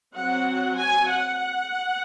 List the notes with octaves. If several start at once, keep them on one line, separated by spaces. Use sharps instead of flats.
F#3 C4 F#5
G#5
F#5